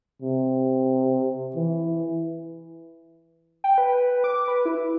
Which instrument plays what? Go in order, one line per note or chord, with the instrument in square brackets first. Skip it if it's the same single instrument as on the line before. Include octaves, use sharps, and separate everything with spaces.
[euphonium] C3
E3
[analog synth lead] G5
B4
D6
B4
E4